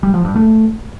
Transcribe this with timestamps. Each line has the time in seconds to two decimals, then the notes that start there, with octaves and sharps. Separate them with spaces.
0.03 G3
0.14 F3
0.25 G2
0.36 A3